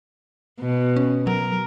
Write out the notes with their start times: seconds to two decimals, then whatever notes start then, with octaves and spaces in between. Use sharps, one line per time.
0.60 B2
0.96 C#4
1.27 F#3 A#4